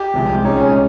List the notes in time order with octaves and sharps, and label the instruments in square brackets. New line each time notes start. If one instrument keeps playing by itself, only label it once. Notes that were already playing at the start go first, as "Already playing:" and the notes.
Already playing: [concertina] G4
[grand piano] C2 C3 F3 G#3
[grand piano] A#2 G#3 C#4 G#4 C#5 [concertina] D#4
[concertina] C#4